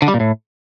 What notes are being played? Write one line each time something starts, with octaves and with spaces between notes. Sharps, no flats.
D3
G3
A#2
A2